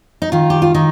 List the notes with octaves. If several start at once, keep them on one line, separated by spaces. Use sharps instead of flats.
D#4
D#3 F4
G4
F4
D#3 D#4